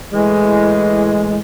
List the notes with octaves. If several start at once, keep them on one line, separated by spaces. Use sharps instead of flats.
A2 E3 G#3